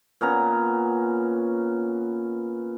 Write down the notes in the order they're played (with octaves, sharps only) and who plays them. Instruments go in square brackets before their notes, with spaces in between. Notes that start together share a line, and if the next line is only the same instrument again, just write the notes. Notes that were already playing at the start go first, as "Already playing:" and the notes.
[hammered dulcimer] A#2 B3 C#4 A#5